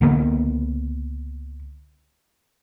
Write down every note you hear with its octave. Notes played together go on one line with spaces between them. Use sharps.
C#2 D3 A#3 B3